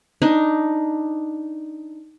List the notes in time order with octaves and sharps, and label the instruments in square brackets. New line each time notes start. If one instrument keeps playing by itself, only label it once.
[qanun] D4 D#4